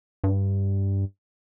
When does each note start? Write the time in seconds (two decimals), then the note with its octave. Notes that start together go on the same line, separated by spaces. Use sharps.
0.24 G2